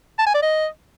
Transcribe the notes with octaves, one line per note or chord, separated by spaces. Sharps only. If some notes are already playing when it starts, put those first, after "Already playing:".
A5
G#5
D5
D#5